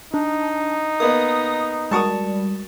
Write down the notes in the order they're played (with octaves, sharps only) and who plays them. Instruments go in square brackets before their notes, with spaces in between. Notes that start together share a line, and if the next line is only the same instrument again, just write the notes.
[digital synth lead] D4 [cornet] D#4
[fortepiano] A#3 B3 D#5 [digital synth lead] D#6
[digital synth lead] G3 [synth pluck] G#3 F#4 A#4 [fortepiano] A5 C#6 D#6